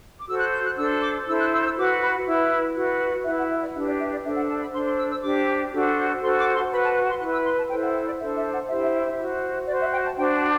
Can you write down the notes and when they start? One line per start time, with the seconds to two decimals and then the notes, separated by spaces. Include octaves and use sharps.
0.20 D6
0.28 F#4 A4 C5 E6
0.40 F#6
0.52 G6
0.65 F#6
0.77 D4 A4 C5 E6
1.02 D6
1.27 E4 A4 C5 E6
1.40 F#6
1.52 E6
1.64 E6
1.76 F#4 B4 D6
2.02 B5
2.26 E4 B4
2.76 F#4 B4
3.24 E4 B4 E5
3.38 F#5
3.50 E5
3.62 D5
3.75 D4 G4 B4 E5
3.87 D5
4.00 E5
4.11 D5
4.23 D4 A4 C5 E5
4.36 F#5
4.48 A5
4.61 B5
4.73 D4 A4 C5 C6
4.86 C6
4.98 E6
5.10 E6
5.22 D4 G4 C5 D6
5.72 D4 F#4 A4 C5
6.22 F#4 A4 C5 C6
6.38 D6
6.54 C6
6.71 F#4 B4 B5
6.83 A5
7.09 C6
7.20 E4 B4 F#6
7.33 E6
7.45 C6
7.58 A5
7.70 E4 A4 C5 G5
7.83 F#5
8.07 D5
8.19 D4 A4 C5 E5
8.36 E5
8.53 F#5
8.69 E4 G4 C5 E5
8.81 E5
8.94 E5
9.06 E5
9.18 F#4 C5
9.67 F#4 C5 D5
9.81 E5
9.92 G5
10.06 A5
10.17 D4 F#4 C5 G5
10.34 A5